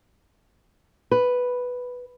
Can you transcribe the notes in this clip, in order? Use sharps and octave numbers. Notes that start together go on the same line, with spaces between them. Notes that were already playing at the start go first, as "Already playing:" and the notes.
B4